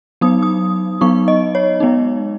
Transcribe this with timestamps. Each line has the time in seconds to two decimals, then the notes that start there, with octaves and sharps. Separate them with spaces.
0.21 F#3 B3 D#4 D#6
0.43 D#6
1.01 F#3 B3 D#4 C#6
1.28 D#5
1.55 C#5
1.80 G#3 B3 D#4